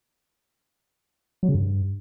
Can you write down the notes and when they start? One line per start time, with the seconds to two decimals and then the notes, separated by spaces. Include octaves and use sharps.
1.43 F#3
1.49 C#3
1.55 G2